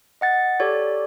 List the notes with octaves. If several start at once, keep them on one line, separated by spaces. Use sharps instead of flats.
D#5 F#5 A6
G4 A4 C#5 D5